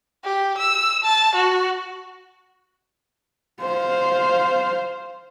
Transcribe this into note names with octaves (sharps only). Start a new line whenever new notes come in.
G4
E6
A5
F#4
C5 F5